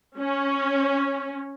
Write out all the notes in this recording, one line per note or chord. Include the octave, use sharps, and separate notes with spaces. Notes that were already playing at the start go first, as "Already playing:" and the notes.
C#4